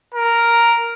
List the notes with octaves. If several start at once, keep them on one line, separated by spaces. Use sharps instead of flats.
A#4 A#5